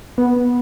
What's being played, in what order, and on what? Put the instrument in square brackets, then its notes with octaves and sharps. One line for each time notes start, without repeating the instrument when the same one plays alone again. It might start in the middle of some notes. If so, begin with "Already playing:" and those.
[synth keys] B3